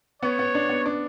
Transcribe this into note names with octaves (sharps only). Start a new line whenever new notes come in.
B3 C#5
B3
D4
B3
D4